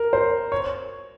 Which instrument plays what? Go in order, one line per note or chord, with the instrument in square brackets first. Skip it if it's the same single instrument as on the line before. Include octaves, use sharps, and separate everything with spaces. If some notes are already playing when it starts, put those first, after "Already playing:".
Already playing: [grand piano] A#4
C5
C#5